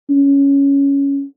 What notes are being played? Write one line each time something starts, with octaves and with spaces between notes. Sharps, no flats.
C#4